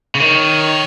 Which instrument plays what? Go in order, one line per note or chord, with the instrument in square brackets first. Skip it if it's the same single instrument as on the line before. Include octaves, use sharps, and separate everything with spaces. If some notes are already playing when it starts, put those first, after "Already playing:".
[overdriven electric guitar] C#3
[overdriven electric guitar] D#3 [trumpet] C#5